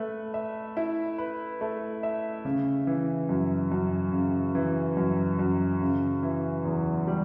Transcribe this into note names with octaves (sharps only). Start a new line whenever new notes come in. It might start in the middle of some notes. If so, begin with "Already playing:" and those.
Already playing: A3 B4
E5
E4
B4
A3
E5
C#3
E3
F#2
F#2
C#3
E3
F#2
F#2
C#3
E3
E2
G3